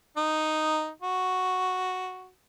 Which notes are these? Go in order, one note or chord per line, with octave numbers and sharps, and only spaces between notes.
D#4
F#4